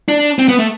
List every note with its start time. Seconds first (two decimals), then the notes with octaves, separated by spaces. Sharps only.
0.09 D4
0.39 C4
0.48 B3
0.59 A3